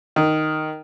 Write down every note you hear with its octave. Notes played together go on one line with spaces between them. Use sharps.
D#3